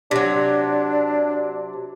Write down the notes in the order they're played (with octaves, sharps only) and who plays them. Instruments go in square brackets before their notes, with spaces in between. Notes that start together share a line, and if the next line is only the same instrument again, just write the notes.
[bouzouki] C3 F#3 [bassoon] D4